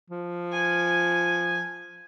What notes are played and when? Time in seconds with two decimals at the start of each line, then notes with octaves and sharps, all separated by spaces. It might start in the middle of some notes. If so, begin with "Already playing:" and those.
0.10 F3
0.53 G#5